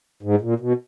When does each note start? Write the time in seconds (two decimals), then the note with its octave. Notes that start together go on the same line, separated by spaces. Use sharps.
0.23 G#2
0.41 A#2
0.60 B2